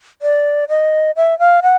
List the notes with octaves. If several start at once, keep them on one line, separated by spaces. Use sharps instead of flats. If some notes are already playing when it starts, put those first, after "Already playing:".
D5
D#5
E5
F5
F#5